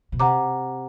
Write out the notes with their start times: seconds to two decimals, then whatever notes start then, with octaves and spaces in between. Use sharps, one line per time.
0.12 B2
0.19 C3 F#5 A#5 D6